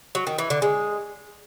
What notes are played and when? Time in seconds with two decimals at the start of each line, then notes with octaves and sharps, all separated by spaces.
0.15 F#3
0.27 D#3
0.38 E3
0.50 D3
0.62 G#3